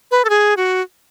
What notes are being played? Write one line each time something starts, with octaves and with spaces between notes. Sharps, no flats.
B4
A4
G#4
F#4